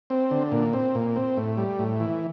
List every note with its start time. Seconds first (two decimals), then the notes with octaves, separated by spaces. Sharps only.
0.10 C4
0.31 D3
0.52 A#2
0.73 C4
0.95 A#2
1.16 C4
1.37 A2
1.57 G3
1.79 A2
2.00 E3